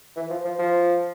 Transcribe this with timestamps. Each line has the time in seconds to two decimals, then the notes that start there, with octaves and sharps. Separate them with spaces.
0.16 E3
0.30 F3
0.45 F3
0.59 F3